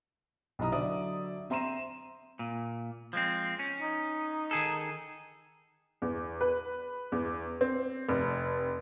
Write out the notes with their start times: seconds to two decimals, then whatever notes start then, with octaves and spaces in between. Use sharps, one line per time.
0.59 B1 C3 E4 D#5 A#5 D#6
0.72 D3 F#3 D5 E5 D#6
1.50 C4 E5 A#5 C6 D#7 E7
2.39 A#2
3.13 F3 G#3 C4
3.59 C#4
3.80 D#4
4.51 D#3 G#4 A4
6.02 E2
6.41 B4
7.12 E2
7.61 C4
8.09 F1